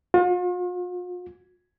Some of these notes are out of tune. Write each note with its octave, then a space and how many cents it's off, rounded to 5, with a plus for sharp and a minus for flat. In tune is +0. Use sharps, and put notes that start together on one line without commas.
F4 +45